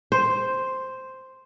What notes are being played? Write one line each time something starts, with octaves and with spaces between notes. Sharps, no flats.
C5